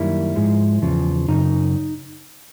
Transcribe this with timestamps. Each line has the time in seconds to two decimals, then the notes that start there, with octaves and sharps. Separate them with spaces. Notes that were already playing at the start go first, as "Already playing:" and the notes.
Already playing: F#2 D#3 G3 A#3 E4
0.36 G#2 F3 G#3
0.82 E2 C#3 F3
1.28 F#2 C#3 D#4